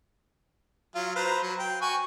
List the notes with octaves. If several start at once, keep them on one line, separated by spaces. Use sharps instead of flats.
F#3 F4
B4 C5 A#5
F#3
G5
F#4 G#5 C#6